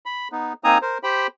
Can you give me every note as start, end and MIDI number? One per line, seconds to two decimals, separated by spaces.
0.06 0.28 83
0.32 0.53 59
0.32 0.53 63
0.64 0.78 58
0.64 0.78 60
0.64 0.78 63
0.64 0.78 80
0.64 0.78 82
0.64 0.78 87
0.82 0.98 70
0.82 0.98 72
1.03 1.27 67
1.03 1.27 72
1.03 1.27 79
1.03 1.27 83